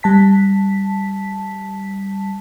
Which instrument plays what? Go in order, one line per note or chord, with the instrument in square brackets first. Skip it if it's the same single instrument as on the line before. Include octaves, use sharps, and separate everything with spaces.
[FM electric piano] G3 A5 B6